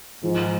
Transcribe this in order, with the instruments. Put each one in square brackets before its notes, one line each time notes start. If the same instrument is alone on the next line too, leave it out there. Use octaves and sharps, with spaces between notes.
[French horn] G#2 [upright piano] F3